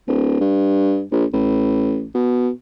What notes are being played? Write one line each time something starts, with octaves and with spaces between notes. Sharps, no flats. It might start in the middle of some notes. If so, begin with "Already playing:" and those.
D1
G2
A#1
A1
B2